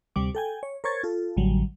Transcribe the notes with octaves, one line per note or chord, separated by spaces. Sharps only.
D2 C3 G3 D6
A4 G5 G#5
C#5
A#4 C5 C#5 C#6 G#6 A6
F4 A4
A1 D3 F#3 G3